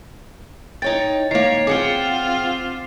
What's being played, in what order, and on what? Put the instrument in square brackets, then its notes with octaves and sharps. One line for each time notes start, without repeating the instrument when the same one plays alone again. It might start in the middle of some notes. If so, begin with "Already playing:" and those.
[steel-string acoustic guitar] D#4 C#5 G5 [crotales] A6
[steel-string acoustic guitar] D#3 A#3 [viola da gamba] C#5 [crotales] C7
[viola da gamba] C4 F4 [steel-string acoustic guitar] G#4 F#5 G5 [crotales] D6